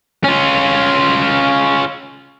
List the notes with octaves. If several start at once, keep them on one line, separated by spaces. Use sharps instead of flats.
C#4 F4